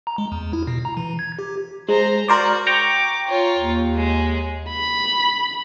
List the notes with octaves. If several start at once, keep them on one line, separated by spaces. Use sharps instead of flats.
A#5
G#3
E2
E4
B2
A#5
E3
G#6
G4
G#3 C5 A#5
F#4 A#4 C5 D5
G5 A#5 C#6 D6
F4 C#5
D#2
G#3
B5